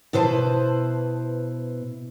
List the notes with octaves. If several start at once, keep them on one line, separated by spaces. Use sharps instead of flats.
B2 E4 B4 C5 A5